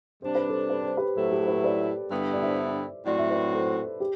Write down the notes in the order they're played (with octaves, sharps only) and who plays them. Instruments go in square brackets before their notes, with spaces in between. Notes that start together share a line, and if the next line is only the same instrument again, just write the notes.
[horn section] C3 G3 D4 [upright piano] C5
[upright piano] B4
A4 C5
B4
C5
G4 B4
[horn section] A2 F#3 A3 E4 [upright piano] A4 C5
[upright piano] G4
A4
B4
C5
B4 D5
[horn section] G2 D3 G3 B3 E4
[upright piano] D5
C5 E5
[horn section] A2 F#3 C4 F#4 [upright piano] D5
[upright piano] E5
B4 D5
A4 C5
G4